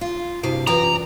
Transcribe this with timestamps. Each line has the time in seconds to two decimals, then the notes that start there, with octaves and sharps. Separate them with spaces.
0.01 F4
0.43 G2 C3 E4 F#4 F5
0.67 F#2 E3 F4 B4 D5 G5 A#5